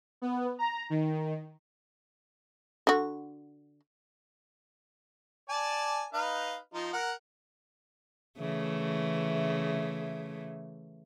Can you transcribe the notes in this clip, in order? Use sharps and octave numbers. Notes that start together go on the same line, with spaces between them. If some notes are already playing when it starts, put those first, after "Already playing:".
B3
A#5
D#3
D3 F#4
D5 G#5 A5
D#4 B4 F5
F3 D#4 F4
A#4 F#5
C#3 E3 A3